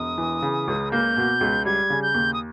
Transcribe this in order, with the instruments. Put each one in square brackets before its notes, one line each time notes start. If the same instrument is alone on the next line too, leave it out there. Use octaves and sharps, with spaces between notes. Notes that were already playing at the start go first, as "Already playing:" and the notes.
Already playing: [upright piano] E1 [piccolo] D#6
[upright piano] E3
C#3
C#2
[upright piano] A#3 [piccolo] G6
[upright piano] B2
C#2
[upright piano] G3 [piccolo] G#6
[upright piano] C#3
[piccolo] G6
[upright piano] D#2
[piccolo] D#6